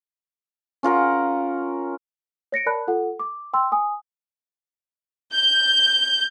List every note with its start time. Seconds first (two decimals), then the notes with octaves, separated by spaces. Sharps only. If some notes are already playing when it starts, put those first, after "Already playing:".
0.83 C#4 F4 A#4 F#5
2.52 C#5 A#6 C#7 D7
2.66 A#4 D5 A5 B5 F#6
2.88 F4 A4 F#5
3.20 D6
3.53 G5 C6 E6
3.72 G#5 D#6
5.33 G6